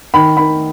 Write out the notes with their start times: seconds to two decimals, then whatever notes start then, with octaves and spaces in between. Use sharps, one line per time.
0.14 D#3 B5
0.37 D#3 B5